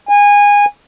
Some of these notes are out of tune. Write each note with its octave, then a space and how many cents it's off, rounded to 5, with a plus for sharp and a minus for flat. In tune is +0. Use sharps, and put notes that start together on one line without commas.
G#5 -20